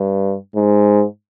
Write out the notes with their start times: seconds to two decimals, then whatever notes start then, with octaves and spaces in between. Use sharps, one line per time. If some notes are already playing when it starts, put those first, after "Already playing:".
Already playing: G2
0.56 G#2